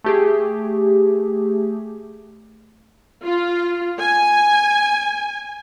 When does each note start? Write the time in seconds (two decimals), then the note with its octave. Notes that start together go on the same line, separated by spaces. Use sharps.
0.04 A3 G4 G#4
3.23 F4
3.99 G#5